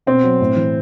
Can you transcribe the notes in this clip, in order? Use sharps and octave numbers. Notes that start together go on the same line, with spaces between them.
B2 C4
F#3
A2
E3